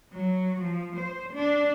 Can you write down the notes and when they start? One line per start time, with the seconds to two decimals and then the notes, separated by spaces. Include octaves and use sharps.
0.13 F#3
0.61 F3
0.96 C5
1.33 D4